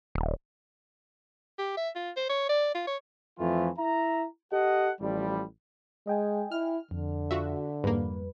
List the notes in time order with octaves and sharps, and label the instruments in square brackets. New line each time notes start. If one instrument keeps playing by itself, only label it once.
[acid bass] D#1
[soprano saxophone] G4
E5
F4
C5
C#5
D5
F4
C#5
[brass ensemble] F2 E3 F3 A3 F4
E4 E5 A#5
G4 A4 D#5 F#5
A1 F3 G3
[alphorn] G#3 [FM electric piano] D#5 G5 G#5
[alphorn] E4 [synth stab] F6
[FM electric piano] F2 [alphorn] D3
[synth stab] F4 F#4 E5
[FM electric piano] F2 G3 B4 [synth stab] G#2 A#3